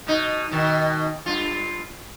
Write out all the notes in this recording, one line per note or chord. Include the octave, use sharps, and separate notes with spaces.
B2 D#4
B2 D#3
G2 F4